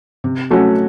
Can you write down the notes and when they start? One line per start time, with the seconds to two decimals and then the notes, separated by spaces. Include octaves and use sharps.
0.24 C3
0.51 F#3 A3 C#4 F#4